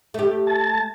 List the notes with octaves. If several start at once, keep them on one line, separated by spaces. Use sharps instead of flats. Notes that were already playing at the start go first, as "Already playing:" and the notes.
A3 G4
A5